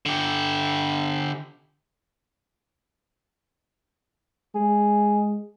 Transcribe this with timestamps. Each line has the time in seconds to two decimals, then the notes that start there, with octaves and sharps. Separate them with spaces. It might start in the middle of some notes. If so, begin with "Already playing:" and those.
0.06 D3 G4
4.55 G#3 G#4